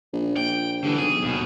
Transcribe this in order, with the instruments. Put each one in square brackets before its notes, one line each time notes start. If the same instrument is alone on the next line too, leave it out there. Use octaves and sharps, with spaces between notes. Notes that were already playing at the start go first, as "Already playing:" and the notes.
[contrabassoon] A#1
[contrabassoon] A#1 [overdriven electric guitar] G5
[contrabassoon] G2 [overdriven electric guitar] D3 E3
[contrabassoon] B1 [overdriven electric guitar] G#4
[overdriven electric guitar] D#2 B2